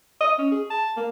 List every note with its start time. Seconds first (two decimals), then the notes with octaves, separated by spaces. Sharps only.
0.21 D#5
0.38 C#4
0.51 G#4
0.70 A5
0.97 A#3